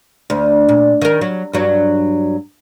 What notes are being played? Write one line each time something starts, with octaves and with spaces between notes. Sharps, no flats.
D2
A#2
D#3 A#4
F#3
G2 F#3